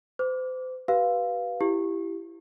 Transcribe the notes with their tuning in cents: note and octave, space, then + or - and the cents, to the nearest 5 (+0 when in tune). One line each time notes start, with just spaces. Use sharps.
C5 -35 D6 -15
G4 -40 B4 -10 F5 +0
E4 +15 G4 +0